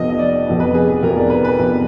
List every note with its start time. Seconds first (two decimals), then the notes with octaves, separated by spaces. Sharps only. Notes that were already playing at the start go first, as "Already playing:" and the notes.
Already playing: F1 F2 F3 B3 D#5
0.10 D#5
0.19 D5
0.46 F1 F2 F3 B3
0.60 B4
0.74 G#4
0.88 G#4
1.03 F1 F2 F3 B3 A#4
1.17 D5
1.30 B4
1.45 B4
1.59 F1 F2 F3 B3